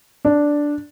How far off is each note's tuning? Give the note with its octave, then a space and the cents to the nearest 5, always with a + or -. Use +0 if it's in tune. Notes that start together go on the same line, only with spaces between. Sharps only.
D4 -5